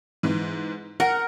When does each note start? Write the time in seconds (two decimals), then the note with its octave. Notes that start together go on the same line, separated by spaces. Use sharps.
0.23 G#2 E3
1.00 A#4 F#5